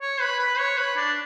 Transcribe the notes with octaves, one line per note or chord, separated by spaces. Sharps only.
C#5
B4
B4
C#5
B4
D4